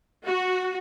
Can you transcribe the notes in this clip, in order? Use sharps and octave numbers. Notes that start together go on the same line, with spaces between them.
F#4